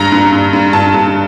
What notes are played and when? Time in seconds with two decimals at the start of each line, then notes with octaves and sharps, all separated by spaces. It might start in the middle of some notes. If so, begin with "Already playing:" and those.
Already playing: G2 A#5
0.12 G2
0.32 G2
0.53 G2
0.73 G2 A5
0.94 G2